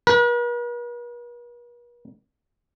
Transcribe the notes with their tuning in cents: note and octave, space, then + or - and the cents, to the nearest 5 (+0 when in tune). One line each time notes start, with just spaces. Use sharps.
B4 -45